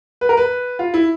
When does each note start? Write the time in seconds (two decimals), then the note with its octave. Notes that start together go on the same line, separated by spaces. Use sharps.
0.21 B4
0.29 A#4
0.37 B4
0.79 F4
0.94 E4